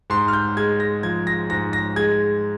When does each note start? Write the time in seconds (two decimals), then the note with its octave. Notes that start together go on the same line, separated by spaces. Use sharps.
0.10 G#2 C6
0.28 F6
0.33 G6
0.57 G#3 G#6
0.80 A#6
1.03 F3 G#6
1.27 A#6
1.50 G#2 A#6
1.73 A#6
1.96 G#3 G#6